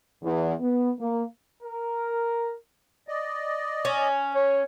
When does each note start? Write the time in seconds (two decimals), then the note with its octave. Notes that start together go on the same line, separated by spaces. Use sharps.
0.23 E2
0.60 B3
0.99 A#3
1.63 A#4
3.08 D5 D#5
3.85 C#4
4.35 C#5